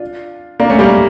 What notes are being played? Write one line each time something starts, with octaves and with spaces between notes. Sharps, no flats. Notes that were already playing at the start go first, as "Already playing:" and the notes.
Already playing: D4 F4
A#3 D4
A3 C#4
G3 A#3